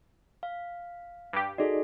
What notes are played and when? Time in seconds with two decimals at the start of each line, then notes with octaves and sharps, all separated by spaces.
0.43 F5
1.33 G2 G4
1.58 D#4 F#4 G#4 A4 D5 D#5